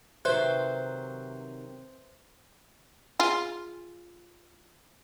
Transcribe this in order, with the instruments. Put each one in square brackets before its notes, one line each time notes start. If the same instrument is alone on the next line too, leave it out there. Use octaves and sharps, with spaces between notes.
[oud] C3 D#3 F#3 [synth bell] B4 E5 F#6 [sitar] C5
[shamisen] F4 G#4